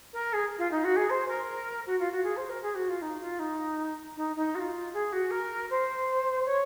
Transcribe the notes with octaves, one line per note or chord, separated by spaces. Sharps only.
A#4
G#4
F4
D#4
F#4
G#4
C5
A#4
F#4
F4
F#4
G#4
C5
A#4
G#4
F#4
F4
D#4
F4
D#4
D#4
D#4
F#4
F4
G#4
F#4
A#4
C5
C#5